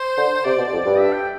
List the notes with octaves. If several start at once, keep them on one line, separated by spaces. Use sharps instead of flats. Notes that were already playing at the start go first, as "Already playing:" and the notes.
Already playing: C5
D3
C3 D5
B2
F2
G2
E5
G5